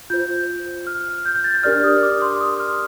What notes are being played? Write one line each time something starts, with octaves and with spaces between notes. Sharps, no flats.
F4 C5 G6
F6
G6
G6
A6
G6
D4 G4 A#4 D5 F6
D#6
D6
C6
D#6
F6